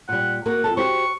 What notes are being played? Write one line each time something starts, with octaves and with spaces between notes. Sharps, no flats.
A#2 G3 F#5
A#3 F#4 A#4 F#5
F2 A4 A5
F#4 G4 C5 C#6